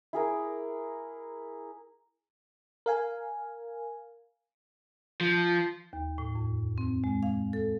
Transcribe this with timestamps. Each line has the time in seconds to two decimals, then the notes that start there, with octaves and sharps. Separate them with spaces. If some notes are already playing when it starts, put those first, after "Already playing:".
0.13 E4 G#4 A#4 D6
2.86 A#4 F5 G#5
5.21 F3
5.93 D#2
6.18 A2
6.35 F2
6.78 C4
7.04 G#3
7.23 F5
7.53 A4